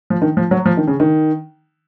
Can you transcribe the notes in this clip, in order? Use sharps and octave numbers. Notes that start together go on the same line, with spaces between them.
F3
D#3
F3
F#3
F3
D#3
C#3
D#3